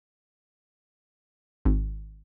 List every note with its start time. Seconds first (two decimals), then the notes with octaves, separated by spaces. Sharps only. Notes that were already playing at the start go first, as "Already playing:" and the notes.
1.65 G#1